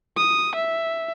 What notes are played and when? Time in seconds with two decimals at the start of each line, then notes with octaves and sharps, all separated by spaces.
0.17 D#6
0.55 E5